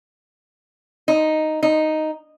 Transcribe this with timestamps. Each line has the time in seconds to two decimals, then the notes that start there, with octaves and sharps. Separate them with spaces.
1.08 D#4
1.63 D#4